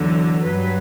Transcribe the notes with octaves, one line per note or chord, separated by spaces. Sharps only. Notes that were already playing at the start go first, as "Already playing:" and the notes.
Already playing: E2 D3 F#3
G2 F#3 B4